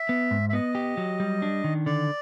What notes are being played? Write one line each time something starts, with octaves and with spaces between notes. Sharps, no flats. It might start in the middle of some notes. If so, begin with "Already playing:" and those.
Already playing: E5
B3
G#2
E5
B3 D#5
G4
F#3
G3
D4
D#3
D3 D5